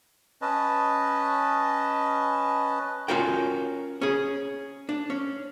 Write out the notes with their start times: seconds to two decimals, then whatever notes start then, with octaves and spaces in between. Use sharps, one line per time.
0.42 C#4 B4 D#5 A5
3.08 C#4 F4 F#4 A#4 G5
4.01 C#4 G#4
4.89 D4
5.10 C#4